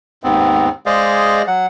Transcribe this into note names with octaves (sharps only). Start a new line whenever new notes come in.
D#2 G#2 B3 C4
G#3 G#4 C5 D5 D#5 F5
F#3 F#5